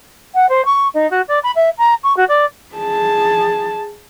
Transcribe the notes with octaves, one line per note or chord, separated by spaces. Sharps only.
F#5
C5
C#6
D#4
F#4
D5
B5
E5
A#5
C#6
F#4
D5
G#4 A5